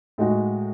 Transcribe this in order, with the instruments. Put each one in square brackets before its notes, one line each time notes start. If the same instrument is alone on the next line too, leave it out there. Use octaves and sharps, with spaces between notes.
[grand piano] A2 G#3 D#4 F#4